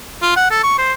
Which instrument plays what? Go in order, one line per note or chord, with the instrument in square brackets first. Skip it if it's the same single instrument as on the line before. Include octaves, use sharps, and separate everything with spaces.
[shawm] F4
F#5
A4
C#6
C5